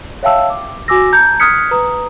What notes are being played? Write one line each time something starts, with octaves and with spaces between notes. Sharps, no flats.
C#5 E5 F5 G5 A5 E6
D6
F#4 G#5 D6 E6 A#6
A5 A#5 G6 G#6
D#6 F6 F#6 G#6 B6 C#7
B4 A#5 D#6